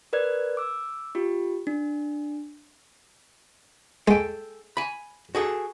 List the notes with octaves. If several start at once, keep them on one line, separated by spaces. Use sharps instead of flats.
A#4 B4 D5 F#6 G#6
D6 E6
F4 G4
D4
G#3 A4 G5
G#5 B5
F#4 G#4 A4